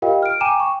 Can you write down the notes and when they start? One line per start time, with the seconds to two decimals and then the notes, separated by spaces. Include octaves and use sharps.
0.02 F4 G4 A#4 D#5 F5 G5
0.23 F6 D7
0.41 G5 G#5 A#5 D6 D#7 E7
0.60 G5 C#6